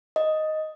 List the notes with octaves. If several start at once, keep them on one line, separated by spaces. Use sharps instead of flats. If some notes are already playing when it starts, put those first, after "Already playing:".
D#5